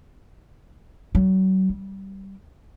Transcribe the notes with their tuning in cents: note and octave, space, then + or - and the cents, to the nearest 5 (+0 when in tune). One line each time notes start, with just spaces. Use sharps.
F#3 +35
G3 -15